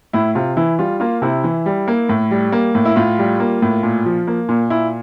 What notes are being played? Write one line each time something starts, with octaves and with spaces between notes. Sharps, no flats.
A2 E4
C3 F4
E3 E4
G3 F4
A#3 F4
C3 E4
E3
G3
A#3
A2
G3
A#3
A2
E4
A2 F4
G3
A#3
A2
A#2
F3
A#3
A#2
A#2 E4